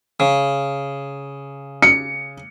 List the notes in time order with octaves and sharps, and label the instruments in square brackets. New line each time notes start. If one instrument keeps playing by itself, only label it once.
[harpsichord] C#3
[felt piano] C#7